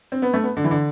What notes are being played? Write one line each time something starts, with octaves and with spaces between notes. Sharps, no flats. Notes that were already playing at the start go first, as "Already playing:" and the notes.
C4
B3
A3
B3
D3
E3
D3